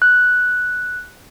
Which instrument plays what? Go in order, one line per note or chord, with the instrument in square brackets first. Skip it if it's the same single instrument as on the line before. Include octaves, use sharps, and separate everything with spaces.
[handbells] F#6